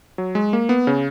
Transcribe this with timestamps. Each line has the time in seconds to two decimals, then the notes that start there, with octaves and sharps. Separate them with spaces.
0.18 F#3
0.35 G#3
0.53 A#3
0.69 B3
0.87 C#3